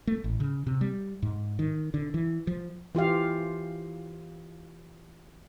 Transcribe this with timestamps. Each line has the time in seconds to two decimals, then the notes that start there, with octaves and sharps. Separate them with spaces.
0.07 A3
0.24 A1
0.40 C#3
0.67 C3
0.81 G3
1.22 G#2
1.59 D#3
1.94 D3
2.14 E3
2.47 F3
2.95 E3 F4 G4 F5